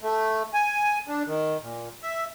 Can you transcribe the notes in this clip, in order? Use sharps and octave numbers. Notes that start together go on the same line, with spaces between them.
A3
G#5
D4
D#3
A#2
E5